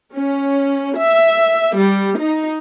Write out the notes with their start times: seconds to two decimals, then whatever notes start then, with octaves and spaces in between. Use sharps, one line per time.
0.14 C#4
0.98 E5
1.78 G3
2.19 D#4